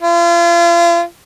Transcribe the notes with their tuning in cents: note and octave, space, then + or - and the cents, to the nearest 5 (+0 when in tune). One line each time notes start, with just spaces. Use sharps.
F4 -35